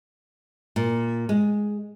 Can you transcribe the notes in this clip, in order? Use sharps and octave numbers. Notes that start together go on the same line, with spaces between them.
A#2
G#3